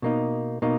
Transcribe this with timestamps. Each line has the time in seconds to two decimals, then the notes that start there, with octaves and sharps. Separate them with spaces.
0.02 B2 A#3 D#4
0.62 B2 A#3 D#4